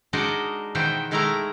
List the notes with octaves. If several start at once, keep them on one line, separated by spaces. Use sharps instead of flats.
G#3 D4 D#4 F#4 A#4 D#5
B2 D#3 E3 B3 C5 G5
D#3 G#3 A3 E4 A#4 A#5